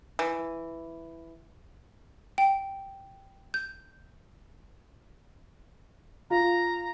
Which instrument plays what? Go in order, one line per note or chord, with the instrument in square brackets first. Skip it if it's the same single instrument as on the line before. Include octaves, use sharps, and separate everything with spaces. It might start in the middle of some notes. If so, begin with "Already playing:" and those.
[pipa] E3
[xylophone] G5
G6
[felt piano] F4 [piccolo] A#5